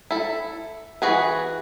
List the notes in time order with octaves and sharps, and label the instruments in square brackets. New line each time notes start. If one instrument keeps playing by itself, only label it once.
[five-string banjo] E4 A4
E3 B3 F#4 G#4 B4